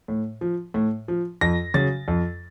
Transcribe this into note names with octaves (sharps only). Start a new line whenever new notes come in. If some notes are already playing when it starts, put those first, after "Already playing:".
A2
F3
A2
F3
F2 A#6
C#3 F#3 A6
F2